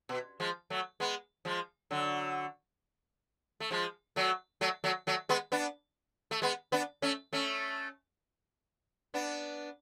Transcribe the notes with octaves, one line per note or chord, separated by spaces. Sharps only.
B2
F3 G#3
F#3 A3
G#3 B3
F3 G#3
D3 F#3
A3
F3 G#3
F#3 A3
F#3 A3
F#3 A3
F#3 A3
G#3 B3
B3 D4
A3
G#3 B3
B3 D4
A3 C#4
A3 C#4
B3 D4